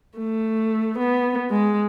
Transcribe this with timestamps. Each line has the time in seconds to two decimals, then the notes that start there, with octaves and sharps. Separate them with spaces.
0.18 A3
0.99 B3
1.50 G#3